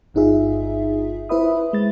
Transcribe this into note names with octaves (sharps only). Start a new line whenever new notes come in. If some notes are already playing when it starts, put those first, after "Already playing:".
G1 G2 D#4 F4 G#4 E5
E4 B4 C5 E5 B5 D#6
G#3 A6